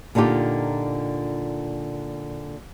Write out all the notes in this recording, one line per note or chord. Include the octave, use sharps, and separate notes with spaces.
A#2 D3 D#4 F4 G4